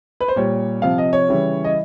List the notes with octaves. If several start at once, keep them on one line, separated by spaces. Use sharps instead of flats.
B4
C5
A#2 G3 C#5
C3 F3 F5
D#5
C#5
C#3 E3 G3
D#5